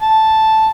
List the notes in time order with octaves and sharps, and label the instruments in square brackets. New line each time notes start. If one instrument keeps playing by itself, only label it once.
[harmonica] A5